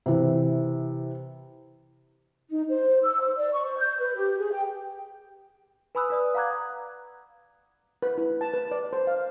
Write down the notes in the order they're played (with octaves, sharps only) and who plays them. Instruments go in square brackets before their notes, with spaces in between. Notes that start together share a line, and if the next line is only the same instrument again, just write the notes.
[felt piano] C3 E3
[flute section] D#4
C5
E6
C5
D5
C#6
C5
G6
B4
G4
G#4
G5
[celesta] B4 G#5 B5 D#6 E6 F#6
B4 D5 D#6
F5 F#5 A#5 D6 F#6 G#6
D#6
[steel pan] B4
E4
A5
B4
D5
C5
F5